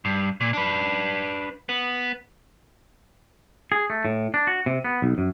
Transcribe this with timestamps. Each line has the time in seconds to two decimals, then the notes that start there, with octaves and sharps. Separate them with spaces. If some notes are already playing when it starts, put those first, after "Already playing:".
0.05 G2
0.41 A#2
0.53 D4 B4
1.69 B3
3.72 G#4
3.90 A3
4.05 A2
4.34 D4
4.47 F#4
4.66 C3
4.85 B3
5.02 B1
5.18 F#2